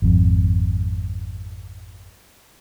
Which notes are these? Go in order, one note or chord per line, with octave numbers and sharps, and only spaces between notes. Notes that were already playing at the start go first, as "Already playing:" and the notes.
G#1 F2